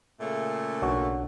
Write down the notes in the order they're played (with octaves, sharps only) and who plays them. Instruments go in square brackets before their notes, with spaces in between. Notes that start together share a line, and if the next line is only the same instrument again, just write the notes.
[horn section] A#2 C#3 A3
[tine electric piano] B1 D4 [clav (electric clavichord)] F#4 C#5